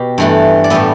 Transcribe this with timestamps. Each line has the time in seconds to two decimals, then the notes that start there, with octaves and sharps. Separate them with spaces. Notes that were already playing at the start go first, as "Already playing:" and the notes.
Already playing: B2 G4
0.18 G2 E3 A3
0.64 D5
0.70 A2 G3 B3 E5